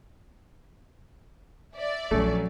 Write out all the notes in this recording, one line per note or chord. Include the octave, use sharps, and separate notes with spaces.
D5 E5
A#1 F3 F#3 A3 C#4